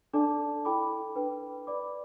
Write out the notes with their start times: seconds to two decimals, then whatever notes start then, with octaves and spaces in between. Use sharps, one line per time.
0.13 D4 A4 D5 A5 D6
0.65 E4 A4 G5 B5 D6
1.16 D4 B4 G5
1.67 B4 D5 B5 D6